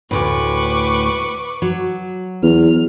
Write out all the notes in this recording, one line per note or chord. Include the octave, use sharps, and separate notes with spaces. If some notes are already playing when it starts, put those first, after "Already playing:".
D2 A2 B4 C#6 D6
F#3
E2 F6